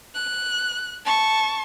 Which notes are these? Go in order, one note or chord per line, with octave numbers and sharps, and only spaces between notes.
F#6
A5 C#6